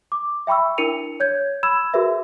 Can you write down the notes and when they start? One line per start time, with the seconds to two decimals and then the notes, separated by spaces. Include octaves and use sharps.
0.12 D6
0.47 E5 G5 B5 C#6 E6
0.78 D4 E4 A#4 C#7 D#7 F7
1.20 C#5 G6 G#6
1.63 B5 E6 G#6 E7
1.94 F#4 G#4 A#4 B4 E5